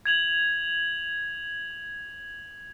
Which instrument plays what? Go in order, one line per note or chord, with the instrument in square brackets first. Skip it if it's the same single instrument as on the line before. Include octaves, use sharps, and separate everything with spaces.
[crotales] G#6 F7 F#7